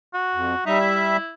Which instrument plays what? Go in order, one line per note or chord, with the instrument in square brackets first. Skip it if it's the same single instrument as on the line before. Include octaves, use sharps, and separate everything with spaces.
[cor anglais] F#4
[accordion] F2
[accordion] G3 E5 [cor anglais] D#4
[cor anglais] E4